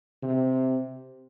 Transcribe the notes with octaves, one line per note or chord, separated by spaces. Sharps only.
C3